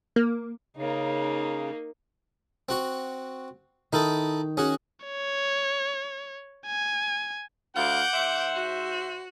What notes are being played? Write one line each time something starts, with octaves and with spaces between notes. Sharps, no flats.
A#3
C#3 A#3 D#4
C4 F#4 C#6
D#3 D#4 E4 A4
C#4 F#4 G#4
C#5
G#5
D2 F5 F#5 D6 G6
G#2 C5 E5
F#4